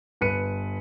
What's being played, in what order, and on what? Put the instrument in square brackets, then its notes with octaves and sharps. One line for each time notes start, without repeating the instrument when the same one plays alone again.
[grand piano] G1 B4 C#7 D#7